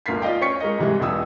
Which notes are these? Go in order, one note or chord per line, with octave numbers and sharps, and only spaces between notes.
G1 D2 A#4 F5 B6 C7
F4 D5 D#5 F5 G5
C#4 G5 C#6 B6 C#7
G#3 A#4 D#5
G#2 C3 E3 G3 G#3
E1 C#2 F5 D#6 E6